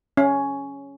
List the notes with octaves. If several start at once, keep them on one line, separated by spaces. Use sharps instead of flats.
C#4